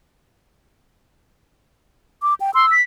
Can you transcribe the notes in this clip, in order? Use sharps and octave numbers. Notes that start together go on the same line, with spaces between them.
D6
G5
C6 E6
B6